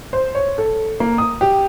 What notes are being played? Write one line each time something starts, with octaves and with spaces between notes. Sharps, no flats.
C5
C#5
A4
A#3
D#6
G4